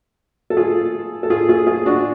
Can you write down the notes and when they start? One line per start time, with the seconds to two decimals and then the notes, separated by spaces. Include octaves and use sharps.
0.50 A4
0.57 F4 G#4
1.23 A4
1.30 F4 G#4
1.49 F4 G#4
1.67 F4 G#4
1.86 D4 F#4